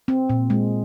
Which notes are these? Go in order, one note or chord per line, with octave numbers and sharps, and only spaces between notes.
C4
A#2
G#3